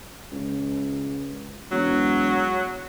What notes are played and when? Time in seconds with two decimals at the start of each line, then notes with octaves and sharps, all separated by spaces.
0.32 C#2
1.72 E1 F#3